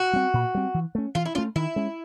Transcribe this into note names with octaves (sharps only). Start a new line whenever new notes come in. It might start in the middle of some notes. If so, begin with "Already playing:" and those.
Already playing: F#4
G3 C4
A#2
G3 C4
E3
A3 C#4
E3 F4
E4
A3 C#4 F4
D#3 E4
G#3 C#4